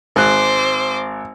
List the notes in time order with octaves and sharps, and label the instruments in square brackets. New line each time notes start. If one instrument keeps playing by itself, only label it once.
[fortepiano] G#1 F#6 [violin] C5 D6